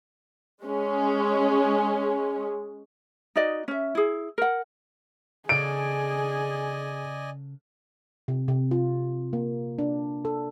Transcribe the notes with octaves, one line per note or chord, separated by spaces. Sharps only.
G#3 C#4
D#4 F#4 D5 D#5
C#4 E5
E4 G#4
A#4 F#5
C#3 G#4 A4 D5 D#5 G#5 D7
C3
C3
F4
A#3
D4
A4